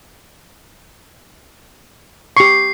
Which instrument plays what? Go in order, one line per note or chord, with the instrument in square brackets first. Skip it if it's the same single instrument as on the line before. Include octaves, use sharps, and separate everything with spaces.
[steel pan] G4 C#6 [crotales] C7